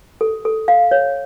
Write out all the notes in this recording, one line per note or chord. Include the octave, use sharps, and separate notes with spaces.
A4
A4
F5
C#5